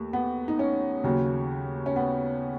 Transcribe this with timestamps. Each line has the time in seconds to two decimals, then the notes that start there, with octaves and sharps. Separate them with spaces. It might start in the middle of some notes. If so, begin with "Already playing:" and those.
Already playing: D#2 A3
0.13 B3
0.48 D#4
0.59 C#4
1.04 D#2 C#3 F#3
1.86 C#4
1.96 B3